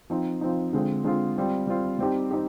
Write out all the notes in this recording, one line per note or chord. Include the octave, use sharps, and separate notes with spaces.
F3 C4 D#4
F3 C4 D#4
D3 G#3 C4 F4
D3 G#3 C4 F4
G3 C4 F4
G3 C4 F4
G3 C4 D#4 G4
C4 D#4 G4